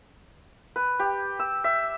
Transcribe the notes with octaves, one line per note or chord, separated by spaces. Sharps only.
B4
G4
E6
E5